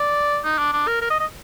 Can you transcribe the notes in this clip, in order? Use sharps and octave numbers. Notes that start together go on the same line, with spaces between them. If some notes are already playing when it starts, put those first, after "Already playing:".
Already playing: D5
D#4
D4
D4
A#4
A#4
D#5
D#5